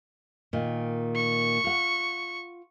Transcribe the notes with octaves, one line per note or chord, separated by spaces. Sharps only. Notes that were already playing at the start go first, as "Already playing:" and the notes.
A#2 D#3
C#6
F4 F#5